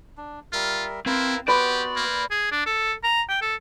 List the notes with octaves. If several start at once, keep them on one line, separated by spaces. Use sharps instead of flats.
D4
G3 F4 A#4 E5
C4 E4 A#4 B4 F5
B3 F#4 G4 B4 D5 C6
A#3
G#4
D4
A4
A#5
G5
A4